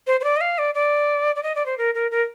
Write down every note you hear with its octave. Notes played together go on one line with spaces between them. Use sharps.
C5
C5
D5
D#5
F5
D5
D5
D5
D#5
D5
C5
A#4
A#4
A#4